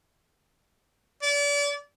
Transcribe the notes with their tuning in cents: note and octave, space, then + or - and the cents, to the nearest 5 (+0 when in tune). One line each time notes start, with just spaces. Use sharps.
D5 -35